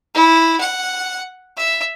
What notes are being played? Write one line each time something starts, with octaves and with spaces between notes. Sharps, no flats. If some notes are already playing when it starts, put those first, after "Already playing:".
E4
F#5
E5